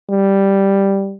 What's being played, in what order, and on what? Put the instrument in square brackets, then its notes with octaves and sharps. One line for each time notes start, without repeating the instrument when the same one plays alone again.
[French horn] G3